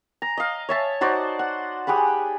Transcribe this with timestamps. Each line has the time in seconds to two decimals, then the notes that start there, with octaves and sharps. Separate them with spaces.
0.22 A#5
0.37 D#5 F5
0.69 C#5 E5 A5
1.01 D#4 F#4 C5 D5
1.39 F#5
1.87 G4 G#4 F#5 B5